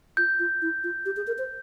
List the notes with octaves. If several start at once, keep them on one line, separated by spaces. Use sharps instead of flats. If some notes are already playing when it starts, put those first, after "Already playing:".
F4 G6
F4
E4
F4
G4
G#4
A#4
C5